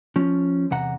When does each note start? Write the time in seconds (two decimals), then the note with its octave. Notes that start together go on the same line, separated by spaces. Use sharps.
0.16 F3 C#4
0.71 E2 C3 F#5 A#5